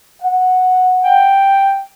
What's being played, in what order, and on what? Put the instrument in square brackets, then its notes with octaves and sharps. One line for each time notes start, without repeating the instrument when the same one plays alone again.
[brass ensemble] F#5
[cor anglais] G5